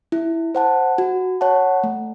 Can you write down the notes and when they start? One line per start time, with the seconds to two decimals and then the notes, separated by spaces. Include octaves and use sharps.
0.12 E4
0.55 C5 F#5 A5
0.98 F#4
1.41 C#5 F#5 A5
1.84 A3